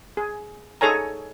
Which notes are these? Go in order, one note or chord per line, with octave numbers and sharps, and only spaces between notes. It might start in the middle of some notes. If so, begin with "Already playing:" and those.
G#4
D#4 G#4 A4 C#5 G#5 A#5